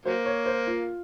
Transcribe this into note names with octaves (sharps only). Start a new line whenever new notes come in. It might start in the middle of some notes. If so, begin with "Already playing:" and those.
F#3 A#3 C5
C#5
C5
F4